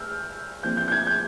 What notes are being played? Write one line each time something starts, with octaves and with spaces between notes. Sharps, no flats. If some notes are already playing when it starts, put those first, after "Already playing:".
Already playing: E6 F6 G6
A#2 F3 C4 G6
G6
G6
G#6
G6